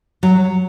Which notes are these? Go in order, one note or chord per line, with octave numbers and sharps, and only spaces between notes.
F#3